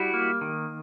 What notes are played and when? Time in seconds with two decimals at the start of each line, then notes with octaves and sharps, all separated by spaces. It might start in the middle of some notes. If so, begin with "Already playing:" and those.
Already playing: G3 E4 F#4
0.14 A#3
0.41 D#3